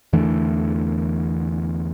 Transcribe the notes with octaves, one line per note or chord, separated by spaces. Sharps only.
E2 D3 E3 A3